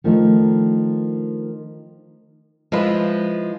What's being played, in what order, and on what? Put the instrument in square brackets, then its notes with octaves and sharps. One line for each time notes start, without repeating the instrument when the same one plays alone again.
[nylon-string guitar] D#3 F3 A3 D4 D#4
F3 G#3 E4 B4